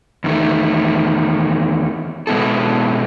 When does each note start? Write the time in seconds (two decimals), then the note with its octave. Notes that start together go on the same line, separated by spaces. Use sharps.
0.24 E2 D#3 A3
2.27 B2 G#3 B3 E4 A4